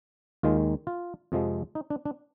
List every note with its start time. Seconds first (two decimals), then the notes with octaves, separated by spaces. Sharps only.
0.43 D#2 D#3 G#3 F4
0.87 F4
1.32 F2 C3 F3 G#3
1.75 D#4
1.90 D4
2.05 D4